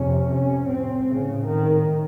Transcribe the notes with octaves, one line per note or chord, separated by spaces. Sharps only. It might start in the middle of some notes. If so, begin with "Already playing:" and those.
Already playing: F2 C3 C#4
C#4
A2 C4
C#3
D#3